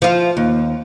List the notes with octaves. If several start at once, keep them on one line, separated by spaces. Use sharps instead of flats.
F3 F4
D#2